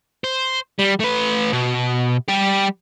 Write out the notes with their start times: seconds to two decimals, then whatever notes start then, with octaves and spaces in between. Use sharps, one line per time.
0.24 C5
0.79 G3
1.00 A3 B4
1.53 B2
2.29 G3 G4